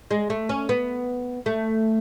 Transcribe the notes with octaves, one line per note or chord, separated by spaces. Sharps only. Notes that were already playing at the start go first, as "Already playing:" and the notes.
G#3
A3
C#4
B3
A3